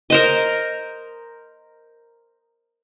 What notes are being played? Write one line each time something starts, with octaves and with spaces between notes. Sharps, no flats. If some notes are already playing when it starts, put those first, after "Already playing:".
A#4 C5 D#5